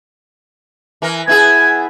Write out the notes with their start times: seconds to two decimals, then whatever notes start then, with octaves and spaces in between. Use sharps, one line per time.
1.02 E3 A#4
1.28 B3 E4 G#4 G#5